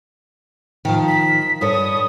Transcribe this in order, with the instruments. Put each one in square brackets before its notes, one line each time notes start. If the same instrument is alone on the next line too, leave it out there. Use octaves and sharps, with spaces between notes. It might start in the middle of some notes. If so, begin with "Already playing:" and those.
[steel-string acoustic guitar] D#3 F3
[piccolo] B6
[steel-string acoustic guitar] G2 A4 C#5 [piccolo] D#6